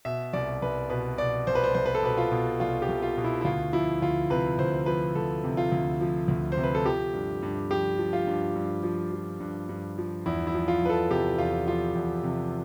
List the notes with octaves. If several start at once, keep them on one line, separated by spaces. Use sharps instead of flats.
B2 E5
C2 D5
C2 B4
B2 B4
B2 D5
C2 C5
B4
C5
C2 C5
B4
A4
B2 B4
F4
B2
C2 F4
G4
C2
F4
B2
E4
E4
D2 F4
F3 E4
D2 F4
C3 B4
D2 C5
F3 B4
D2 A4
C3
F4
D2
F3
D2
C5
C3
B4
A4
F3 G4
G2
G2
F3 G4
F3
F4
G2
G2
F3
F3
G2
G2
F3
E2 E4
E4
F3
F4
E2 B4
A4
C3 G4
E2 F4
F3 F4
E2
C3